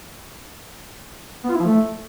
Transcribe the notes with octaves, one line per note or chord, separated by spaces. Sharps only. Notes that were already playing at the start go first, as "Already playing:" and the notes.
B3
F4
E4
F3
A3